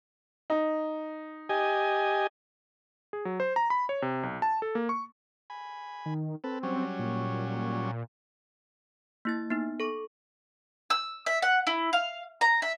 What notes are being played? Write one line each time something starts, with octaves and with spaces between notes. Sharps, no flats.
D#4
G4 D#5 G#5
G#4
F#3
C5
A#5
B5
C#5
C3
B1
A5
A4
A#3
C#6
G#5 B5
D#3
C4 A4 B4
F#3 G3 C#4
A#2
A#3 E4 A6
B3 D#4
A4 C#6
E6
E5
F#5
E4
F5
A#5
E5